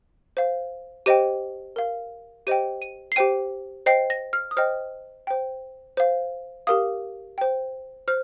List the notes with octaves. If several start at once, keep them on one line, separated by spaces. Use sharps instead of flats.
C5 F5
G4 C5 D#5 G5 D#7
A#4 F5
G4 C5 D#5 G5 D#7
D#7
C7
G4 C5 G5 D#7
C5 D#5 G5 C7
A#6
F6
D#6
C5 D#5 G5 F6
C5 G5
C5 F5
G4 A#4 F5 D#6
C5 G5
C5 F6